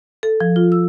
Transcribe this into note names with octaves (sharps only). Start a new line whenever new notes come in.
A4
F3
F4
E6